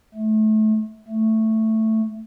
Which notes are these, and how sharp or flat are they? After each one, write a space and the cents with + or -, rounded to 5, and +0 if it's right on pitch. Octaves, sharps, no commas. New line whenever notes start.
A3 -25
A3 +5